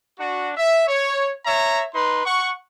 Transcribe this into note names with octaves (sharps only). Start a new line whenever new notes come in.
D4 F#4
E5
C#5
C#5 E5 A#5
D#4 B4 C6
F#5 C#6